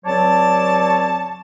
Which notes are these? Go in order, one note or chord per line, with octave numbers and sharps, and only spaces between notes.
C#2 F#3 C4 C#5 D5 A5